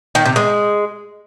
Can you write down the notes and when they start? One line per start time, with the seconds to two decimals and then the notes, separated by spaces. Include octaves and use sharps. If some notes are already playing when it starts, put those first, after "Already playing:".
0.15 D#3
0.26 C3
0.36 G#3